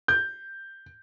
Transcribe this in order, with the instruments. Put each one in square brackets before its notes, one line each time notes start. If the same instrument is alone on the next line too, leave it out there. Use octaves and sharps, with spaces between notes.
[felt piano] G6